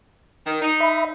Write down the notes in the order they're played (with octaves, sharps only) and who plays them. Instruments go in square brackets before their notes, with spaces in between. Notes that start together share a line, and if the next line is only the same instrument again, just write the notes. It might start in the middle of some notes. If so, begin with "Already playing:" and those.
[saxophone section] D#3
D#4
[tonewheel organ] E5 B5